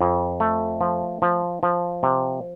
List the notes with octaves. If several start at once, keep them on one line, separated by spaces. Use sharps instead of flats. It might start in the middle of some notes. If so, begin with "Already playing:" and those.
F2
A3
F3
F3
F3
C3